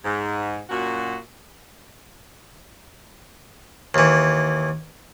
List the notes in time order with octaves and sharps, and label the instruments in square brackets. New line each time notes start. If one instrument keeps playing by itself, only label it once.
[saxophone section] G#2
F#2 A#2 F#4
[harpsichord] D#2 E3